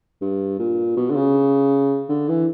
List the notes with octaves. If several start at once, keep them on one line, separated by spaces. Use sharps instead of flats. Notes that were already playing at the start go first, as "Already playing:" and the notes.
G2
A#2
B2
D3
C#3
D3
E3